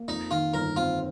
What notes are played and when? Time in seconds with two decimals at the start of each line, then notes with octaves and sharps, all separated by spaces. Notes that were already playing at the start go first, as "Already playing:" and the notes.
Already playing: A#3
0.08 F2 D#4
0.31 D#3 F4
0.54 G1 A#4
0.76 C4 F4